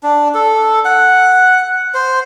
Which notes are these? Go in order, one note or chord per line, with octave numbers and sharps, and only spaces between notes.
D4
A4
F#5
C5